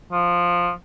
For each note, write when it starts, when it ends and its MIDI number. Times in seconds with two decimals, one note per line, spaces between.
0.12 0.70 53